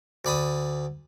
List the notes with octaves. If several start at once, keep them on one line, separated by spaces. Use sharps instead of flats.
D2 D5 B5 D#6